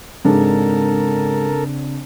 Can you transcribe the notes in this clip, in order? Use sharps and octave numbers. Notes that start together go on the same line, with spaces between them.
G#2 C#3 C4 D4 A4 A#4